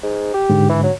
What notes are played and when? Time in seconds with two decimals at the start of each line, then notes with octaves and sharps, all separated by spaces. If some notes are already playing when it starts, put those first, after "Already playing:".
0.03 G#2
0.34 G4
0.50 G#2 D3
0.69 E3
0.83 F#3